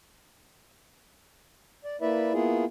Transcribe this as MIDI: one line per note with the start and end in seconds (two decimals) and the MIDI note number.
1.84 1.97 74
2.01 2.33 58
2.01 2.33 64
2.01 2.33 71
2.01 2.33 74
2.01 2.33 76
2.33 2.65 58
2.33 2.65 59
2.33 2.65 64
2.33 2.65 65
2.33 2.65 68